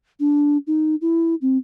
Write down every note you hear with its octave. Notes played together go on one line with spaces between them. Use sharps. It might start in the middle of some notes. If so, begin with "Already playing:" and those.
D4
D#4
E4
C4